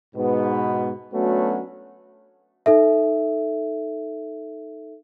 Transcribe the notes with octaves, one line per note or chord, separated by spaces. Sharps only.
G#2 B2 B3
F#3 A3 B3 C#4 D4 F#4
D#4 A4 E5